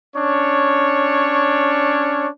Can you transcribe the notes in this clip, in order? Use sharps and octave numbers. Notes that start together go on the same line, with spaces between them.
C#4 D4 C#5